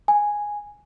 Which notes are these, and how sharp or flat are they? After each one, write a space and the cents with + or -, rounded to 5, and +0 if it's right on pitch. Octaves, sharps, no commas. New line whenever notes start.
G#5 -5